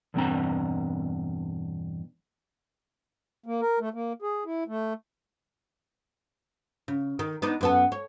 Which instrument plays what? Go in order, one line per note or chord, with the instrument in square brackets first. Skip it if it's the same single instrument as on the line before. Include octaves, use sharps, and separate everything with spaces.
[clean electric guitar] E2 G2 B2 C4 D4 A#5
[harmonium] A#3
A#4
A3
A#3
G#4
E4
A3
[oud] C#3
D#3
B3 D4 D#4
F#2 B3 A4
C#5